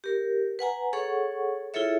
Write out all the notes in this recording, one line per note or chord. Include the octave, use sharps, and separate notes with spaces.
G4 A#4
B4 F#5 G#5 A#5
G#4 A4 C#5 F#5 C#6
E4 F4 G#4 A4 C#5 E5